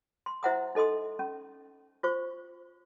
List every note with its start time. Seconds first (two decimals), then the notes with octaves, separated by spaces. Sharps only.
0.26 C6
0.43 E4 C5 E5 F#5 A#5 D#6
0.75 D#4 A4 D#5 C6 D#6
1.19 C#4
2.03 F4 C5 C#6